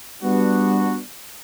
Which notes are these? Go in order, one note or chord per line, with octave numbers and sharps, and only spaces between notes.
G3 B3 D4 F#4